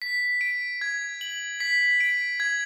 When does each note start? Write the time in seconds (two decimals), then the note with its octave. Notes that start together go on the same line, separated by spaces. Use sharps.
0.02 B6
0.41 D7
0.81 G#6
1.21 F#7
1.60 B6
2.00 D7
2.40 G#6